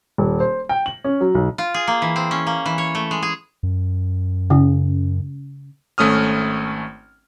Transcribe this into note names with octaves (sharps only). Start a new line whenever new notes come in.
D#1
C5
G5
F#7
C#4
F#3
B1
F4
G#4
A#3
E3
C4
C#4
A#3
E3
C#5
A3
G#3
G#4
F#2
C#3
G#1 A3 C#4 D#6 F6